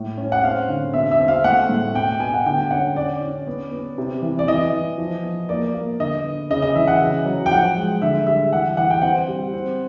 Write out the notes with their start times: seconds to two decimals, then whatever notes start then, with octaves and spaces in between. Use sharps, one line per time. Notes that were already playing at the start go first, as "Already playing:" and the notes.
Already playing: A2
0.17 C#4
0.32 F#5
0.44 C4 F5
0.69 D3
0.93 B2 E5
1.11 E5
1.20 C4
1.28 F5
1.44 A3 F#5
1.69 A2
1.94 B2 G5
2.20 B2 G#5
2.34 F#5
2.46 D3 G5
2.71 C#4 F#5
2.96 C#4 D5
3.21 C#4
3.47 B3
3.72 B3
3.98 C3
4.22 E3
4.39 D5
4.47 E3 D#5
4.73 E3
4.98 F3
5.23 B3
5.49 A#3 D5
5.75 A#3
5.99 D3 D#5
6.24 B3
6.50 C#3 D#5
6.62 D#5
6.75 E3 E5
6.87 F#5
7.00 C#3
7.26 F#3
7.46 G5
7.51 F3 F#5
7.76 G#3
8.02 D3 E5
8.26 G3 E5
8.53 E3 F#5
8.77 E3 F#5
8.90 G5
9.02 C4 F#5
9.28 G3
9.53 C4